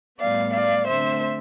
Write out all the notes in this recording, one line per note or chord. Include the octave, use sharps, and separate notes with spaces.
A2 G3 B3 D5 F5
D5 F5
D3 A3 C4 C5 E5